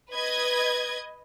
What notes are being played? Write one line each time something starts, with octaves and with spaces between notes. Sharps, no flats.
B4 D#5 G#6